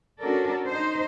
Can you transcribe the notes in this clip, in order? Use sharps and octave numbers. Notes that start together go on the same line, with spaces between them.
C#4 D4 F#4 A4 A#4 D5
D#4 C5